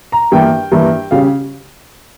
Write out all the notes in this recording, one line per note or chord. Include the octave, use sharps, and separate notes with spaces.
A#5
G2 E3 A#3 E4 G5
G2 E3 A#3 E4
C#3 G3 C#4 F5